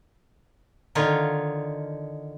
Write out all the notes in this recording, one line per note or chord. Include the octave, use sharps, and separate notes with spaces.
D3 D#3 D#4 F4 C#5